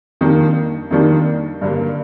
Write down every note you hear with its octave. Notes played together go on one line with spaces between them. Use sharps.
F2 D#3 G3 A#3 D4
F2 D#3 G3 A#3 D4
G2 D3 G3 A#3